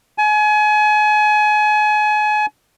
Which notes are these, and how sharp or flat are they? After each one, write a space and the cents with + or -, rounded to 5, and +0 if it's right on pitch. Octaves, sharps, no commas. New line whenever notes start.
G#5 +30